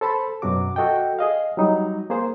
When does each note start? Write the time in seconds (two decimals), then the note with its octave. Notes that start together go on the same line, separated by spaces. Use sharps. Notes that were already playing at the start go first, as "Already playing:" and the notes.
0.01 A4 C5 A5 B5
0.42 F#2 B2 F#3 F#4 D6
0.76 F#4 A4 D#5 G5
1.19 G#4 D#5 F5
1.57 F#3 G3 D#4
2.10 A#3 G#4 C5